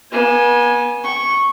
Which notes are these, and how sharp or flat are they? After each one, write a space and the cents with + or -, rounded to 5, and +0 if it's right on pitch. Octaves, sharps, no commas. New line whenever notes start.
B3 -40 G#5 +0
G5 -30 C#6 -10